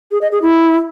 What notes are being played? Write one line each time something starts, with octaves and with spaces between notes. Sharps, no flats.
G#4
D#5
G#4
E4